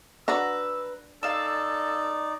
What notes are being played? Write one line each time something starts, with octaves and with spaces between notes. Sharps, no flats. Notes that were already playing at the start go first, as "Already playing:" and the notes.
D4 F#4 B4 F#5 A#5 E6
D#4 A4 D5 F5 E6